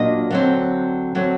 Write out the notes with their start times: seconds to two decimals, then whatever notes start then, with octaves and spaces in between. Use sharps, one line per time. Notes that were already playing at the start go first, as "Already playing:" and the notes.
Already playing: A#2 F#3 A#3 D4 D#5
0.30 D3 F#3 C4
1.15 D3 F#3 C4